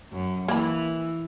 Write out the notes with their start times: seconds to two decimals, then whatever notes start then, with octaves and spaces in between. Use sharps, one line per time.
0.12 F#2
0.48 E3 A#3 B5